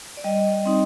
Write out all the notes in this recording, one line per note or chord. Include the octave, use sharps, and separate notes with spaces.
D5
G3 D#5
C4 D#4